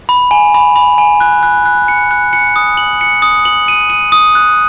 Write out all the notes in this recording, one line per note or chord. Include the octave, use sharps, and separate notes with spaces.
B5
G#5
B5
B5
G#5
F#6
F#6
F#6
C#7
F#6
C#7
D#6
F#7
C#7
D#6
F#7
D#7
D#7
D#6
F#6